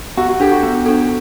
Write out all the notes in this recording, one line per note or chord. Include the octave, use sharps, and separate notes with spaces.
B3 F#4
F#4
D4 G4 A4
F#4
B3
D4 A4